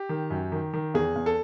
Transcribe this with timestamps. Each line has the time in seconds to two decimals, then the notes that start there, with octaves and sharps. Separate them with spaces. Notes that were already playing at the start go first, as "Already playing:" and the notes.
Already playing: G4
0.09 D#3
0.30 F#2
0.52 D#3
0.74 D#3
0.94 E2 G#4
1.16 E2
1.26 A4